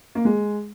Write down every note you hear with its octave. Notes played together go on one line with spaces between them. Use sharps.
A#3
G#3